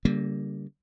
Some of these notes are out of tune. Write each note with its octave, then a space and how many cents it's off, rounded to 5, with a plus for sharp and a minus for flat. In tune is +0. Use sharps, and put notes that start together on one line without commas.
D3 -40 G3 +0 A#3 +0